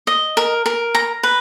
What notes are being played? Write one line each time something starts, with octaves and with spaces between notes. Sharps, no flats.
D#5
A#4
A#4
A#5
B4